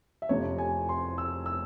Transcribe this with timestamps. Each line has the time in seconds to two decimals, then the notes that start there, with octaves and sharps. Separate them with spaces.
0.22 E5
0.29 F1 F2 C3 C#5
0.58 G#5
0.89 C6
1.18 E6
1.46 E6